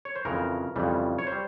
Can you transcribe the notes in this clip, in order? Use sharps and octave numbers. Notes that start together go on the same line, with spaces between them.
C#5
C5
F2 C#3 E3 A#4
F2 C#3 E3 G3
C#5
C5
G3